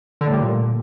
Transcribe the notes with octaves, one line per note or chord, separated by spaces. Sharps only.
D3
A2
G3
A#2